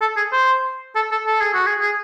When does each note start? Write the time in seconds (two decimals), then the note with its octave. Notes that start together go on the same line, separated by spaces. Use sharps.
0.01 A4
0.17 G#4
0.32 C5
0.96 A4
1.12 A4
1.27 A4
1.41 G#4
1.54 F#4
1.66 G#4
1.80 G#4